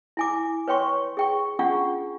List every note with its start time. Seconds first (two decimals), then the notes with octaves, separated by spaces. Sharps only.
0.17 E4 G#5 D6
0.68 B4 C#5 G5 C6 C#6
1.17 G#4 G5 C#6
1.59 C#4 D4 F4 G#4 F#5 C#6